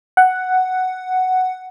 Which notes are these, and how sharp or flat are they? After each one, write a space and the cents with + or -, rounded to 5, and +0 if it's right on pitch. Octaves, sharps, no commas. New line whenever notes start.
F#5 +5